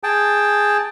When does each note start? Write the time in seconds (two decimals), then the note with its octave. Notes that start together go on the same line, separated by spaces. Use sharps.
0.04 G#4 G5 A5